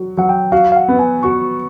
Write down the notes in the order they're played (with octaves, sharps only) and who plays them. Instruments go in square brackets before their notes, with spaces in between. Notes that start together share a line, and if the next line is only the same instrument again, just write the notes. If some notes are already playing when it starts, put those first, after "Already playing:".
Already playing: [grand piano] F#3 F#4
[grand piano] F#3 [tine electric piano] F#5
[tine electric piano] G5
[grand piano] F#4 [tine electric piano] F5
[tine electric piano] F5
F#5
[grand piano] B3
[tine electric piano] G#5
[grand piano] F#4 [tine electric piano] C#6